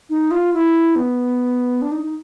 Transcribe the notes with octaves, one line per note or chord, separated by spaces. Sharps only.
D#4
F4
E4
B3
D4
D#4
D#4